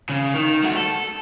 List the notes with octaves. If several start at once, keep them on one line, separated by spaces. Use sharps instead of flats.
C#3
D#3
A3 F#4
A4